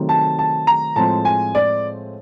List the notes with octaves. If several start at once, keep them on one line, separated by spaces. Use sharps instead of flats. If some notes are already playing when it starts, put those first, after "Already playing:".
Already playing: C3 D#3 F#3 A3 C4
A5
A5
A#5
A2 F3 G#3 C4 A5
G#5
D5